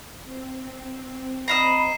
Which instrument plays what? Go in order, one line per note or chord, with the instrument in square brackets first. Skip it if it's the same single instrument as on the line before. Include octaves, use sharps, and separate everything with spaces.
[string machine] C4
[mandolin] D#5 F5 A#5 [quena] B5 [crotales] C7 E7